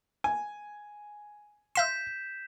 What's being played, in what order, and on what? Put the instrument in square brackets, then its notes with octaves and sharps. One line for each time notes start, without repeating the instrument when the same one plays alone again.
[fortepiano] G#5
[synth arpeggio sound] E5 F5 C6 [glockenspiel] G6 B6 E7